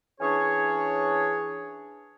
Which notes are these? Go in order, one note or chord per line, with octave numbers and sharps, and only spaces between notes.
E3 C#4 D4 G#4 C#5